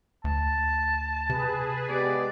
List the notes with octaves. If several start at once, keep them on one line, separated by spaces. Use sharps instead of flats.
D2 A5
C3 G#4 B4
G#3 B3 G4 D5